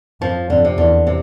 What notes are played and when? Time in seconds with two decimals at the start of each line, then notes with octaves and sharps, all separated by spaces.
0.21 F2 F3
0.50 F2 D3
0.65 C3
0.78 E2 D3
1.07 C3